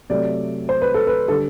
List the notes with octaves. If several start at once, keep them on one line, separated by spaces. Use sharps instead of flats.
C3 F#3 A3 D5
C5
B4
A4
B4
D3 G3 A4